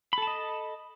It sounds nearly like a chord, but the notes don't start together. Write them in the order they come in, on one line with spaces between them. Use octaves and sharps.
B5 A4 A5 D#5